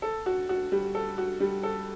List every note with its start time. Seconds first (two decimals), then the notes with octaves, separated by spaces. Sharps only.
0.02 A4
0.26 F#4
0.49 F#4
0.72 G3
0.95 A4
1.18 F#4
1.40 G3
1.63 A4